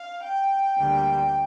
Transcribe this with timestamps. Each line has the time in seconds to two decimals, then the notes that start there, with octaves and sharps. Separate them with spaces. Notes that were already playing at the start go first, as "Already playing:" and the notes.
Already playing: F5
0.23 G5
0.77 D2 D3 G3 A#3